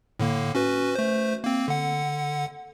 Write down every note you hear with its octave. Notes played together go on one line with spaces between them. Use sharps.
A2 D3 A#3
C#4 F#4 B4
A3 C5
A#3 C4
D3 F#5